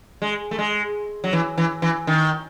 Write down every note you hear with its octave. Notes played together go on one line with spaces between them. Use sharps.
G#3
A3
G#3
F#3
E3
E3
E3
D#3